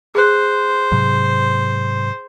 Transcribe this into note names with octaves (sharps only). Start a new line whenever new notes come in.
G#4 C5 F#6
G#2 C3 F#3